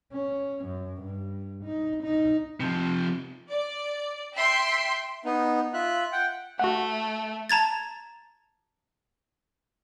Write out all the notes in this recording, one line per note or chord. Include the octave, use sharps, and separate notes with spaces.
C#4
F#2
G2
D#4
D#4
C3 F3
D5
E5 G5 C6
B3 D#4
F4 E5 F#6
F#5 G5
A3 F#4 F#5
A5 A#5 G#6 A6